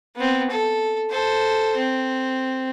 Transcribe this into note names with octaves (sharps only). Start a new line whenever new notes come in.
B3 C4
A4
A4 C5
C4